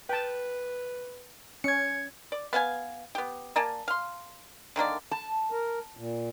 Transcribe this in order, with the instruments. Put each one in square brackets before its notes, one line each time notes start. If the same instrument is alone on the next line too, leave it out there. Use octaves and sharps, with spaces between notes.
[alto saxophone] B4 [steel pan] G5 A5
[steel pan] C#4 [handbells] G#6 C#7
[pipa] D5
B3 F5 F#5 G#5
B3 G4
A#3 D5 G#5 A5
F5 C6
D3 D#3 A#3 D5
[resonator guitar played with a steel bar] A5
[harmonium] A#4
A#2